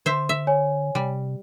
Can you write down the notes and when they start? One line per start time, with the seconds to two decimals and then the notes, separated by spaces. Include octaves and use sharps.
0.06 D3 C5 E5
0.29 E5
0.47 C#5 G#5
0.95 C3 G3